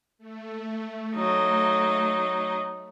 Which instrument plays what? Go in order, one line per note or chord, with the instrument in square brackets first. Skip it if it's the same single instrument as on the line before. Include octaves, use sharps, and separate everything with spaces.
[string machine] A3
[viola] F#3 D#4